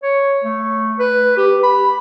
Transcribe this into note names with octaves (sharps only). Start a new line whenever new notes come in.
C#5
A3
B4
G4
B5